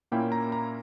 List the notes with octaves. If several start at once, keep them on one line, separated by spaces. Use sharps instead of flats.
A#2 A#3 C#4 E4 G5
A#5
A#5